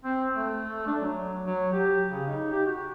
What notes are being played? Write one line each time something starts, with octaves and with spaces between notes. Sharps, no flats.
C4
A3
D4
F#3
F#3
G4
C#3
D#4
G4
F#4